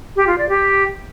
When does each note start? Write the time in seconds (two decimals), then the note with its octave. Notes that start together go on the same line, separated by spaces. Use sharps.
0.16 G4
0.27 F4
0.38 D5
0.49 G4